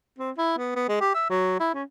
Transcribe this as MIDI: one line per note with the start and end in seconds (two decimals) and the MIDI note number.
0.19 0.31 60
0.38 0.57 64
0.58 0.74 59
0.76 0.85 59
0.89 0.98 56
1.01 1.14 67
1.15 1.28 76
1.30 1.56 54
1.60 1.71 64
1.74 1.83 61